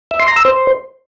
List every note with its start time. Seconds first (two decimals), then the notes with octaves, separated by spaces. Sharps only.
0.11 E5
0.20 C6
0.28 A#5
0.36 E6
0.45 C5